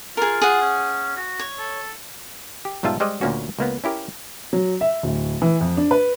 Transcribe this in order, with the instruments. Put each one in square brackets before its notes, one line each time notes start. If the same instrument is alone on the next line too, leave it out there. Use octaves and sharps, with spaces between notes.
[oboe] F4 [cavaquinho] G#4 A#4
[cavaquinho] G#4 F#5
[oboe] C#4
F#4
[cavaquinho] C#5
[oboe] A4
[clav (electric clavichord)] G4
B1 G#2 G3 F4 E5 A5
G3 G#3 C5 D5 D#5
D2 A#2 A#3 C#4 F#4
C#2 A#3 B3
C#4 E4 G4 A#4
[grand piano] F#3
E5
D1
E3
F2
D4
B4